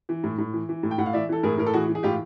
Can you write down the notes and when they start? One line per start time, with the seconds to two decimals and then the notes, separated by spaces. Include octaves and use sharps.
0.09 E3
0.24 A2
0.38 A2
0.53 E3
0.69 E3
0.83 A2
0.91 G5
0.98 A2 F#5
1.06 F5
1.13 E3 D5 E5
1.29 E3 A4
1.43 A2 G#4 A#4
1.58 A2 A#4
1.66 A4
1.73 E3 F#4 G#4
1.89 E3
1.95 G#4
2.03 A2 F4 G4